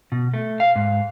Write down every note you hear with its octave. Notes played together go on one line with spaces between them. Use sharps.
B2
A3
F5
G#2